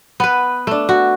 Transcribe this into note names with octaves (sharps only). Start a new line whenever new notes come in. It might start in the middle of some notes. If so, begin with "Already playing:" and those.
B3 B4
A3 D4
F#4